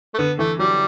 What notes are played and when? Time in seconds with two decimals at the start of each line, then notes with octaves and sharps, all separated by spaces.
0.14 A3
0.18 D3 B3
0.39 E3 A3
0.59 F#3 G3